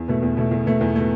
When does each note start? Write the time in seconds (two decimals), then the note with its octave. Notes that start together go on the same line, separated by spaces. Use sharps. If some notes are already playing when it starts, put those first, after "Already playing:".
Already playing: E2
0.08 B2 A3
0.22 E2
0.37 B2 A3
0.51 E2
0.66 B2 A3
0.81 E2
0.96 B2 A3